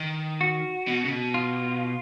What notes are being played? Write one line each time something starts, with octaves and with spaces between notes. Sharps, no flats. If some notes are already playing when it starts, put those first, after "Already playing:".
Already playing: D#3
F#4
B2
C#3
B2
F4